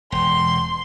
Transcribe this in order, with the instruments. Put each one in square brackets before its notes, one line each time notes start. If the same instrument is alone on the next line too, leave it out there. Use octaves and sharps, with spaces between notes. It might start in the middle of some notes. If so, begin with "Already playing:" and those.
[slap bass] E1 [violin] C6